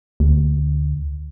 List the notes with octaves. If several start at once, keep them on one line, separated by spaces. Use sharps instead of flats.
D2